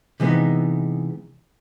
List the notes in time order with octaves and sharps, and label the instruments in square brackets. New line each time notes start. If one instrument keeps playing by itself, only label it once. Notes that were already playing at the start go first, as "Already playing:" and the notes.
[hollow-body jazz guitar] C3 E3 G#3 B3 D#4